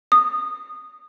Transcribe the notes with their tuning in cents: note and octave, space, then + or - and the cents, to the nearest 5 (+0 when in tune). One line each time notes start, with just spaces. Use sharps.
D#6 -15